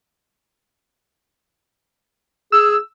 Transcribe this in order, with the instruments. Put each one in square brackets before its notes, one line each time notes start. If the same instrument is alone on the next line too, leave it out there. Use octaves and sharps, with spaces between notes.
[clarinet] G#4 [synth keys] E6